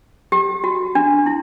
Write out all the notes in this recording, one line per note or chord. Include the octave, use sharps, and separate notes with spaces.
G4
F#4
D4
E4